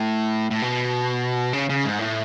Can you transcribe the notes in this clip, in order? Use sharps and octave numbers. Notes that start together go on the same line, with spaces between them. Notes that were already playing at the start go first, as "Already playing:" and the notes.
Already playing: A2
A2
B2
C#3
C#3
G#2
A2